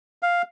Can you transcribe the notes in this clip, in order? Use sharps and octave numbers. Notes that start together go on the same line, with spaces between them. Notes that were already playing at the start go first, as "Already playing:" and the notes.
F5